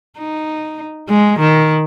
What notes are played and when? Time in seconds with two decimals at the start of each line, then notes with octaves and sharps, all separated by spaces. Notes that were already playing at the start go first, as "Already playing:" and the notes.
0.18 D#4
1.09 G#3
1.39 D#3